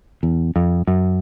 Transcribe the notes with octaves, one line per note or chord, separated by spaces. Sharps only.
E2
F2
F#2